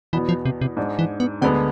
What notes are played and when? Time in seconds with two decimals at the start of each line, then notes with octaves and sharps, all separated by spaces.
0.13 E2 B2 E3 B3
0.29 F3
0.45 C3
0.61 C3
0.77 G#2 G#3 D4
0.99 E3
1.20 B3
1.41 D2 D3 G#3 B3 C4